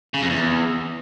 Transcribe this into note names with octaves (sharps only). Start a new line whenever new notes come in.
C#3
F2
E2